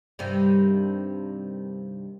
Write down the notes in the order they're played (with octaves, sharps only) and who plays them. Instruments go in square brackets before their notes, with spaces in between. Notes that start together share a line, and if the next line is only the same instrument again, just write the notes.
[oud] G2 C3 D#3